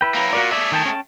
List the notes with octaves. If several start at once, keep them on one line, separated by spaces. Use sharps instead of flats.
E4 B4 G5
F#3 A#3
A#2 A#3 F#4 A#4 D5
A3 G#4 D5 E5
D#3 G5 A5
C#4 G5 A5